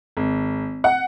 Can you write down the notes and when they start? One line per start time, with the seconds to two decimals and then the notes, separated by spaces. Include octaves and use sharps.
0.17 G#1
0.84 F#5